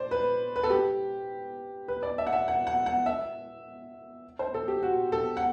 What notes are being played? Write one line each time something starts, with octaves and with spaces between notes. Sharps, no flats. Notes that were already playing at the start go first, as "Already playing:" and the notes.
Already playing: C5 D5
B4
B4
A4
G4
B4
D5
E5
F#5
E5
F#5
F#5
F#5
E5
C5
A4
G4
F#4
A4
F#5